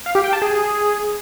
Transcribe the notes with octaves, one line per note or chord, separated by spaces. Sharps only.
F5
G4
G5
A5
G#4